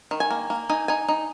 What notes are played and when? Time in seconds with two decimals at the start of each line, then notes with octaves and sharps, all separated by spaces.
0.11 D#3
0.20 G#5
0.31 A#3
0.50 A#3
0.69 D#4 G#5
0.88 D#4 G#5
1.09 D#4